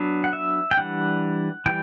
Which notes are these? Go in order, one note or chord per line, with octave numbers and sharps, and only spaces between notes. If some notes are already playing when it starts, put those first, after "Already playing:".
Already playing: F#3 B3 D4
F#5
E5
G5
E3 G3 D4 F#5
E3 G3 G5